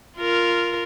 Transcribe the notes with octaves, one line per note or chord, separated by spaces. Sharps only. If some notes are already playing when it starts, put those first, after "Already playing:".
F4 A#4